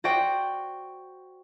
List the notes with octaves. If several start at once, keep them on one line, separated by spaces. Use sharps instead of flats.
F#4 C5 D5 F#5 G5